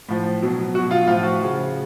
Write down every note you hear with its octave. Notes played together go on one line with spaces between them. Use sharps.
A2 F3
B2 F#3
B2 F#3 F#4
F4
A2 F3 F4
F#4
C#3 F3